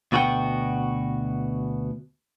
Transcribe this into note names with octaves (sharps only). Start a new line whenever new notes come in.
D2 B2 F#4 G#4 F#5 G5